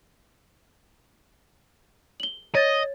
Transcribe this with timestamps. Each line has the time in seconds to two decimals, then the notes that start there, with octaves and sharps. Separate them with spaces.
2.20 F#7 G7
2.55 C#5 D#5 A6